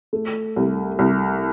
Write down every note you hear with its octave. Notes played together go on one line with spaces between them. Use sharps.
A3
C2
C2